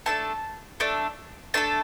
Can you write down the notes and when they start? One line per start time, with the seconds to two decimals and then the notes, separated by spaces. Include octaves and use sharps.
0.06 A3 D4 A4 A5
0.80 A3 D4 A4
1.54 A3 D4 A4 A5